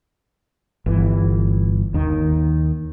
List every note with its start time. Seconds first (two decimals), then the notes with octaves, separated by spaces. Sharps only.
0.86 G1 E3
1.94 D#2 D#3